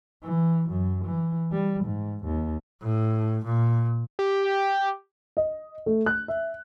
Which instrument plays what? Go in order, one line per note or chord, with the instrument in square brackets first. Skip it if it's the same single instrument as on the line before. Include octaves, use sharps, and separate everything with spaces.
[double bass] E3
F#2
E3
G3
G#2
D#2
A2
A#2
[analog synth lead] G4
[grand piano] D#5
A3
F#6
E5